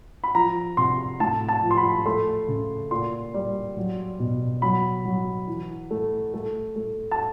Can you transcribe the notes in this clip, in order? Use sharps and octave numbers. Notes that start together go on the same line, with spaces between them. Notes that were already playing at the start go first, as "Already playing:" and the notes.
B5
F3 A#5
C3 C6
A2 A5
A5
F3
C6
B5
A3 C6
C#3
A#2 C6
G3
F#3
B2
F#3 B5
F#3
E3
A3
A3
A3
A5